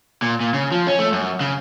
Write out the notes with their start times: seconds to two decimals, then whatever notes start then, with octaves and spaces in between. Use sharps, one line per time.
0.22 A#2
0.41 A#2
0.54 C#3
0.72 F3
0.87 C#4
0.99 A3
1.12 F#2
1.41 C#3